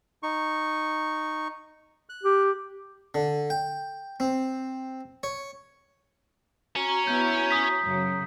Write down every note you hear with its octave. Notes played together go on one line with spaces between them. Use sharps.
D#4 C#6
F#6
G4
D3
G5
C4
C#5
C#4 F#4 C#5 A#5
B3 E4 G6
D#6 B6
F#2 C#3 F#3